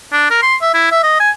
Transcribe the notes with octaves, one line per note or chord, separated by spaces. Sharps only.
D4
A#4
C6
E5
E4
E5
D#5
G#5